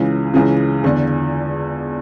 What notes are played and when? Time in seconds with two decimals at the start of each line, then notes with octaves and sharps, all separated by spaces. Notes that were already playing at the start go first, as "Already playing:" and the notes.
Already playing: C#2 C#3 E3
0.34 C#2 C#3 E3
0.84 E2 D3